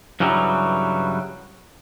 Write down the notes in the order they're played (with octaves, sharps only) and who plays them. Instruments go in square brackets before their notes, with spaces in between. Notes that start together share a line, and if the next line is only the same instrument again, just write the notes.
[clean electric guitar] G2 C#3 E3 F#3 G3